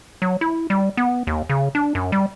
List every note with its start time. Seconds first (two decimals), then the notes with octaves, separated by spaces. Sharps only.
0.22 F#3
0.41 E4
0.70 G3
0.97 B3
1.27 D#2
1.50 C#3
1.75 D4
1.95 F#2
2.12 G3